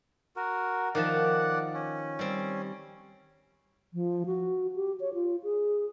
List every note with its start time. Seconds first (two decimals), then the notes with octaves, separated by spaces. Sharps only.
0.36 F#4 A#4
0.95 D#3 F3 D5 F#5 A5
1.74 C#4
2.19 G3 C4
3.94 F3
4.26 F#4
4.76 G4
5.00 C#5
5.14 F4
5.43 G#4